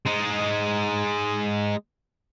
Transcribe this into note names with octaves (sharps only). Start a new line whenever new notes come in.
G#3 D#4